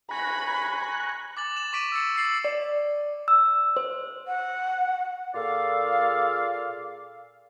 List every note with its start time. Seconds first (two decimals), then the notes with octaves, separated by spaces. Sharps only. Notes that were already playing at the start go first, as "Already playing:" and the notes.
0.11 G#5 A#5 B5 C#6 F#6
1.37 D6 A6 F#7
1.57 E7 F#7
1.73 C#6 D6 B6 D7 D#7 F#7
1.92 E6 A6 C#7
2.15 E6 A6 C7 F#7
2.45 D5
3.28 E6
3.77 C5
4.27 F#5
5.35 A#2 F4 G#4 A4 D5 F5